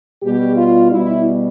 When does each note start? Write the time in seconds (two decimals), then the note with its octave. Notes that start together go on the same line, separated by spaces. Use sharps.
0.22 B2 G3 G4
0.56 F4
0.91 B2 G3 E4